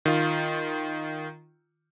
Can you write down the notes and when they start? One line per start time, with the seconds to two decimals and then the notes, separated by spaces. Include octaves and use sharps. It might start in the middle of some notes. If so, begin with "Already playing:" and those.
0.06 D#3 F4